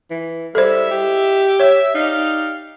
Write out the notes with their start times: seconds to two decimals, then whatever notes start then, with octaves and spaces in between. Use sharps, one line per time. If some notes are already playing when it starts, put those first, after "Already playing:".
0.11 E3
0.55 G3 G#3 E4 A4 C5 E5
0.91 G4
1.60 C#5 E5
1.95 D#4 G4 D5 F5